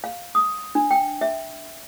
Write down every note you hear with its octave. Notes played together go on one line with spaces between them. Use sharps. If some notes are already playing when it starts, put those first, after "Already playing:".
F5
D#6
D4
G5
E5